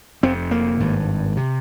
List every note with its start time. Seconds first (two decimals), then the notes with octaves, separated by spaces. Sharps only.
0.23 F1 F2 C3 C4
0.51 A#3
0.80 G#1 G2
1.37 C3